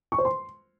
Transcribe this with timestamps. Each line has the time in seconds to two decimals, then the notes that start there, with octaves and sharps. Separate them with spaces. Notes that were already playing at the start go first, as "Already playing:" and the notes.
0.12 C#6
0.18 C5
0.25 C6